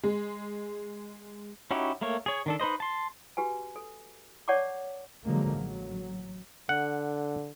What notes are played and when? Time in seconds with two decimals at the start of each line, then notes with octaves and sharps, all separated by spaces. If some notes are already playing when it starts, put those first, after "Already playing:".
0.03 G#3
1.71 C#4 D#4 E4 F#4 G4
2.01 A3 A#3 A#4 C#5
2.26 G#4 C#5
2.46 D#3 D4 A4
2.60 D#4 B4 C5 D#5
2.80 A5 C6
3.37 F#4 G4 B4 G#5
3.76 A4
4.48 C#5 D5 F#5 A5 C#6 D6
5.24 B2 D3 F3 F#3 G#3 A#3
5.53 A1 F#3
6.69 D3 F#5